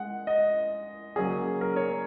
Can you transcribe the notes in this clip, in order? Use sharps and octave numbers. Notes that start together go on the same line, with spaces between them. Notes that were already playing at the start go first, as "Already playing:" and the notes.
Already playing: G#3 F#5
D#5
C#3 F#3 A#3 C#4 G#4
A#4
C#5